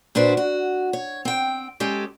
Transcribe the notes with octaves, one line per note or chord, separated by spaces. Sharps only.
A#2 D4 F#4 B4 C5
F#4
C#5
C4 G5
G#3 C#4 G4 A4